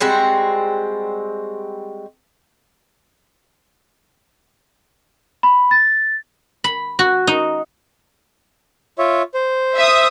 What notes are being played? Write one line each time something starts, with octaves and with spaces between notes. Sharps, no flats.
G3 G#3 C4 F#4
B5
A6
B5
F#4
D#4
F4 C#5 E5
C5
E5 D#6